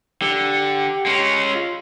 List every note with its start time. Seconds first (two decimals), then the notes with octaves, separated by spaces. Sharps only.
0.22 D3 G4
1.06 G#3 C#4
1.55 F4